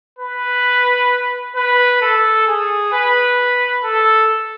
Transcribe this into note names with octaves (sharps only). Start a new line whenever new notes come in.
B4
B4
A4
G#4
B4
A4